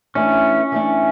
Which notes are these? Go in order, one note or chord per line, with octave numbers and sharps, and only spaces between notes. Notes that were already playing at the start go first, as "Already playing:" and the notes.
E3 A3 C#4 D4
E3 A3 D4